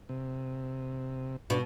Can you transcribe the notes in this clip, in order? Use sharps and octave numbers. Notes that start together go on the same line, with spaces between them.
C3
B2 D4